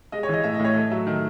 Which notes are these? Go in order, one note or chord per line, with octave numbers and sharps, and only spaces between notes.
G#3 D#5
C#5
E3
D#5
A2 E5
D#5
A2
C#5
A3 D#5
F#3 E5
D#3